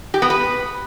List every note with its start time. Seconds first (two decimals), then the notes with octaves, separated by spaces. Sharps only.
0.14 G4
0.22 B3
0.30 B4